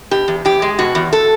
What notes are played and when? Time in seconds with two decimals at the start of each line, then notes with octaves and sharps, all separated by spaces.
0.11 B2 G4
0.28 E2
0.45 E2 G4
0.62 G#3
0.79 B2 F#4
0.95 E2
1.13 A4